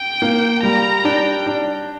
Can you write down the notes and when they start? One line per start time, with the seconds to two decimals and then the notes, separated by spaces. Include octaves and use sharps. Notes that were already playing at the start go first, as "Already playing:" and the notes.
Already playing: G5
0.22 A#3
0.63 G3 A#5
1.05 D4 G5
1.46 D4